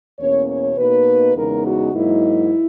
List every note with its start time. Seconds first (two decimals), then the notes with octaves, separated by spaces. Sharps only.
0.18 E2 B2 A#3 C#4 C#5
0.48 C#5
0.77 B2 A#3 D#4 B4
1.35 E2 C#3 G#3 B3 D#4 A#4
1.64 F#4
1.94 G#2 F#3 A#3 D#4 E4